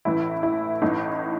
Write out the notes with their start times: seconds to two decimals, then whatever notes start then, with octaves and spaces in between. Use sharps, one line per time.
0.05 A1 A2 E3 E4
0.43 E4
0.82 A1 A2 E3 D#4